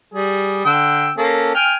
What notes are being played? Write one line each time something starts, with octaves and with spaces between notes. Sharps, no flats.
G3 G#4
D3 G5 E6
A#3 C#4 A4
G5 G#5 F6